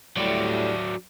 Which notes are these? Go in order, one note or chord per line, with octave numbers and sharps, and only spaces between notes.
A2 F#3 G3 D4